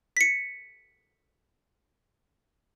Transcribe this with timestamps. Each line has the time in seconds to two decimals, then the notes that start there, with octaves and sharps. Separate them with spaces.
0.17 B6 C#7